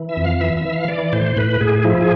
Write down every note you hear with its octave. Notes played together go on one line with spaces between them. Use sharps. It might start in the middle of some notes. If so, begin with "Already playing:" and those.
Already playing: E3
E5
F2
F5
E3 E5
E5
E3
F5
E3 D5
A2 C5
A2 B4
A2 G#4
F3 E4
G#4